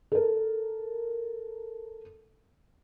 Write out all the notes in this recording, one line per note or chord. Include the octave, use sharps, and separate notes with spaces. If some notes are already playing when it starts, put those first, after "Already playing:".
A4 A#4